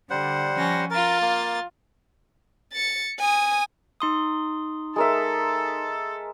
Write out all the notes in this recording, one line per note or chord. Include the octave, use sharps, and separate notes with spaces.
D3 G3 C5 F#5
F3 C#4 A#6
F4 A#4 A6
A#3
A6 C#7
G#5 D#6
D#4 C6 D#6
G#3 A4 A#4 E5